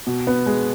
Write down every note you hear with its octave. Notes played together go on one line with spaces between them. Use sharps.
B2
B3
G#3